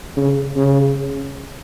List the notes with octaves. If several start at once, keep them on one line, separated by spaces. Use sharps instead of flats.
C#3
C#3